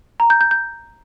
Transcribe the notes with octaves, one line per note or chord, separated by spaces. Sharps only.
A#5
G6
G6
G6